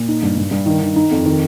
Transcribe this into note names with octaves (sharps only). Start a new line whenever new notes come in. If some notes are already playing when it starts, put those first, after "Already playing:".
Already playing: A#2
D#4
G2
G2
G2
D#3
D#3
D#4
F2
D#3